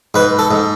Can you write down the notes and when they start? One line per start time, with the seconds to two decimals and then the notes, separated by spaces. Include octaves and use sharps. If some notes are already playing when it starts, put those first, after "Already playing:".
0.14 G#2 B4
0.39 A4
0.51 G#2